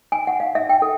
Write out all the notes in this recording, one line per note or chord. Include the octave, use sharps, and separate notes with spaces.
G#5
F#5
F5
E5
G5
A4